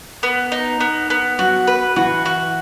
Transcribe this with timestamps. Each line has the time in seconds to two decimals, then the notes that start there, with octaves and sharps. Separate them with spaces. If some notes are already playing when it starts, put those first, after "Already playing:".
0.23 B3
0.52 D#4
0.80 B3
1.10 B3
1.39 F#3 F#4
1.67 B4
1.96 E3 F#4
2.26 F#4